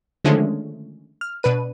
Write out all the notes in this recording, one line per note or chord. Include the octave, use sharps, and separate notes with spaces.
D3 D#3 F3 G#3 A3 C#4
F6
B2 D4 B4 D#7